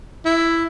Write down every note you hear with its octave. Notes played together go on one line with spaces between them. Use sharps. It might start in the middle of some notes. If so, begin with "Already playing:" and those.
E4